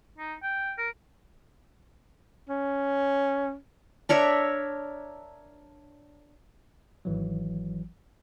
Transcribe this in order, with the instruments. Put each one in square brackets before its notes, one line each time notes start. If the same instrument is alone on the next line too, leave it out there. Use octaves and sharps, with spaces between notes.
[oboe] D#4
G5
A#4
[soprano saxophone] C#4
[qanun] D4 A#4 C#5 E5
[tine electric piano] G#1 E3 F#3